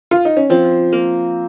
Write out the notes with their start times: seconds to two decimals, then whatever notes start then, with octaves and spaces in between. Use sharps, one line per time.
0.11 F4
0.25 D#4
0.37 C#4
0.50 F3 C4
0.93 A#3